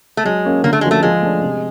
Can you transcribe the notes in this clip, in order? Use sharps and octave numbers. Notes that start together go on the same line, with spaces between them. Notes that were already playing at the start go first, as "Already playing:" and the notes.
A3
F#3 G#3
A#3 C#4
D3 A#3
A3
F3 G#3 A#3 C#4 F#4
A3
F3 G#3
A3 D4
C3